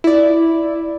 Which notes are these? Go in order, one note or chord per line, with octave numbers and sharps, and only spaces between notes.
E4 D5